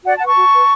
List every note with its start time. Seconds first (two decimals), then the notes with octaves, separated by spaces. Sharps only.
0.06 F#4 D5 F#5
0.16 F#5 A5
0.21 B4
0.27 A5 C#6
0.37 F#4
0.53 B4